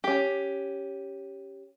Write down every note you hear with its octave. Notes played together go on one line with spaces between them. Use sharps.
C#4 G4